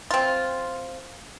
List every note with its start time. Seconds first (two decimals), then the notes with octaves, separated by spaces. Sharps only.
0.11 C4 F4